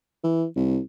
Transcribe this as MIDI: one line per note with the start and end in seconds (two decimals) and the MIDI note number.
0.24 0.46 52
0.56 0.79 36